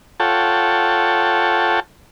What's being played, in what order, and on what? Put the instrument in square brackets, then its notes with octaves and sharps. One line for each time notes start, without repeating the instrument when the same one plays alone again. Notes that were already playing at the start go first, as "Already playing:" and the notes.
[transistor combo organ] F4 A4 C#5 F#5 G5 A5